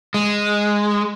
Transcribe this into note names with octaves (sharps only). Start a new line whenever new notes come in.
G#3